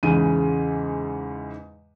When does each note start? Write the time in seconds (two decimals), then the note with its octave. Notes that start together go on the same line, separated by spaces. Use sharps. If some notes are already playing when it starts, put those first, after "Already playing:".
0.03 E2 G#2 C#3 D#7